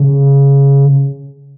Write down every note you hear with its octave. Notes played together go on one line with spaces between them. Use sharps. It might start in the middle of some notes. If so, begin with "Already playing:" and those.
Already playing: C#3